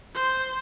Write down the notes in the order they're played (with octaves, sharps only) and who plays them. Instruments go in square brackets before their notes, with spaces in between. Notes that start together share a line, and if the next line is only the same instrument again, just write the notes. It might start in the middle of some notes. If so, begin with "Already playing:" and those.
[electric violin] C5